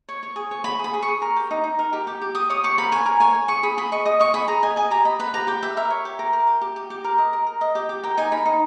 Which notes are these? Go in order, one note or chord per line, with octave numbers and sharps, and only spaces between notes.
C#5
C#5
G#4
C#5
C#5 B5
G#4
B5
G#4
C#6
G#4
A#4
G4
D#4
D#4
A#4
G4
G4
G4
G4 D#6
C#5 D#6
G4 C#6
A#4 B5
C#5 G#5
A#4
C#5 G#5
C#5
G#4 C#6
G#4 B5
G#4 B5
D#5 C#6
D#5 D#6
D#5 C#6
G#4 B5
G#4 A#5
D#5 G#5
D#5 G#5
G4 A#5
D#5 B5
B4 B5
G4 A#5
G4 G5
B4 E5
A#4 E5
C#5
G4
A#4
A#4
G4
G4
G4
G4
A#4
D#5
A#4
A#4
D#5
G4
G4
A#4 G5
D#4 G#5
A#4 B5
D#4